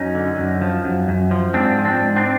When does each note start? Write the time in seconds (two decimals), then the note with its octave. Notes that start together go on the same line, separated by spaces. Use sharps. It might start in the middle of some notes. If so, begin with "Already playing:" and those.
Already playing: F#2 C#4 D#4
0.15 D3
0.38 F#2
0.61 F3
0.84 F#2
1.08 F#2
1.31 F3
1.54 G#2 C4 D4
1.78 F3
1.85 C4 D4
2.01 G#2
2.16 C4 D4